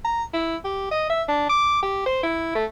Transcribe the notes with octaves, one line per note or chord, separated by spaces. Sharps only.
A#5
E4
G4
D#5
E5
D4
D6
G4
C5
E4
A3